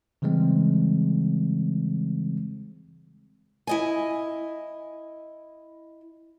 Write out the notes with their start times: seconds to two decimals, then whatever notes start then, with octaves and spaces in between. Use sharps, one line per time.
0.22 C#3 E3 G3 G#3 C4
3.67 E4 D#5 G#5